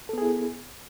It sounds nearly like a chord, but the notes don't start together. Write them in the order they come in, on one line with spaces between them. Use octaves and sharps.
A4 B3 G#4 E4